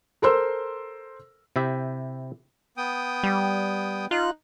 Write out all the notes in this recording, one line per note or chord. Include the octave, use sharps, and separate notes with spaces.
A4 A#4 C5 C6 E6
C3 E4 G4 E5
B3 G5 D#6
G3
D#4 F4 F#6